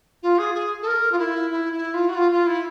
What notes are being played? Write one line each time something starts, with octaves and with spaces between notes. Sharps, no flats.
F4
G#4
G#4
A4
A#4
F4
E4
E4
E4
F4
F#4
F4
F4
E4